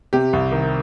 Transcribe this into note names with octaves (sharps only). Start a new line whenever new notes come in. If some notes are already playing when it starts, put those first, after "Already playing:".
C3 G4
C2
D#3